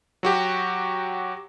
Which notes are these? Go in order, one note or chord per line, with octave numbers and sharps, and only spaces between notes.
F#3 F#4 G4